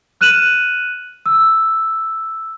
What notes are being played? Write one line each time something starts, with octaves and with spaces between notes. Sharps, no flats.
F6 F#6 D#7 E7 F#7
E6